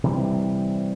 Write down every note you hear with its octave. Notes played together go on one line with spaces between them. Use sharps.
C3 E3 G3